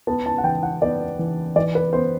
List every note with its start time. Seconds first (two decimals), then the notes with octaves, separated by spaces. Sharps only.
0.07 B3 A5
0.26 A5
0.38 F#5
0.44 E3 G5
0.63 F#5
0.82 B3 D5
1.19 E3
1.56 E3 D5
1.75 B4
1.93 B3 C5